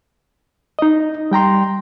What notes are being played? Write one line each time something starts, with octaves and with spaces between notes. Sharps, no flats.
D#4 D#5
G3 G5 A#5 C6